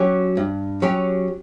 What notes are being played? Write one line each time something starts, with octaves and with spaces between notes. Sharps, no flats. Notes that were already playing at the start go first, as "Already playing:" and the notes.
Already playing: F#3 C#4 G4
G2
F#3 C#4 G4